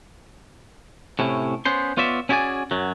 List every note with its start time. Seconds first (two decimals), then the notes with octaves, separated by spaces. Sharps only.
1.19 A2 C3 C#4 E4
1.65 B3 C#4 C5 C6
1.97 B3 F4 C#5 D5 E5
2.29 C#4 E4 F#4 G#4 D5 G#5
2.71 F#2 F#3